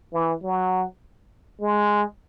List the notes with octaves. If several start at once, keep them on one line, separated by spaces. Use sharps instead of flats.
E3
F#3
G#3